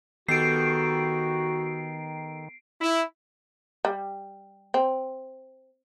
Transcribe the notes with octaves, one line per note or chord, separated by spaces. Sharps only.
D#3 B3 F#4 G4 A4 C7 D7
E4
G3
C4